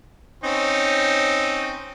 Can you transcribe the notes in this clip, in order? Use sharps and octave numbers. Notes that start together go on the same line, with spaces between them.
C4 C#4 D#4